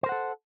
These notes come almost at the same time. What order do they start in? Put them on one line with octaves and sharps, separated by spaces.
C5 A#4 F#5 A4